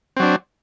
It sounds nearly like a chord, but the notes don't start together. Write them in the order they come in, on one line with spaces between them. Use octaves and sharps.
C4 F#3 D4